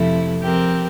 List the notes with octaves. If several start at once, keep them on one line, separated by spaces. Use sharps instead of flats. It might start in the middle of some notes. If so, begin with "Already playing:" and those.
Already playing: F2 C3 F3 A3 E4
F3 C4 G4 A#4